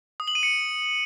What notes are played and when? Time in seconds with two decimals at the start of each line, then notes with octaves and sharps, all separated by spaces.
0.20 D#6
0.28 F#7
0.35 D#7
0.43 C#7